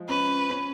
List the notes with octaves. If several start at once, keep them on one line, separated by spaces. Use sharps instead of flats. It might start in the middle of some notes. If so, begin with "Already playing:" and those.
Already playing: F3 G#3
C#4 B4
C#4